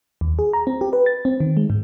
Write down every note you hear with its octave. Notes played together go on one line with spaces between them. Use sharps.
D#2
G#4
A#5
C4
G4
B4
A6
C4
D#3
G#3
G#2